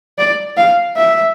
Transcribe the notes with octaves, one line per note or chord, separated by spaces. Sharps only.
D5
F5
E5